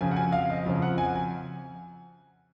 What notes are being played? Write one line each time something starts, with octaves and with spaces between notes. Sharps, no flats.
F2 C#3 F3 G#5
F#5
G#5
F5
D#5
F2 C#3 F3
F#5
G#5
G#5